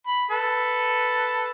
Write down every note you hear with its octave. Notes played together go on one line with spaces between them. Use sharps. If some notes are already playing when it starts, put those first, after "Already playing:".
B5
A4 B4